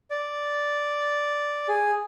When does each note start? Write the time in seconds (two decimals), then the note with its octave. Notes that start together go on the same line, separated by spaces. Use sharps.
0.11 D5
1.69 G#4